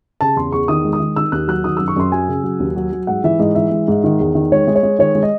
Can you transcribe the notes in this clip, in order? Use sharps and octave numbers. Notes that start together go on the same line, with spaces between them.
C#3 A5
E2 C6
E2 C#6
D#3 D#6
G#3
D#6
D#3
D#3 E6
D#2 F#6
F#3 F#6
D#3 D#6
F#2 E6
C#6
F#2 C6
F#3 G#5
C#3
F#3
D#2
F#3
F#3
G#2 F#5
E3 E5
G#2 D#5
E3 E5
G#3
G#2
D#3
E2
D#3
G#3 C#5
G#3
C#5
G#3
D#3 C#5
G#3
D#5